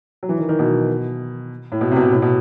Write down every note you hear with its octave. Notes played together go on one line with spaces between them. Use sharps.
F#3
E3
D#3
D#3
B2
A2
B2
C3
B2
C3
A2
B2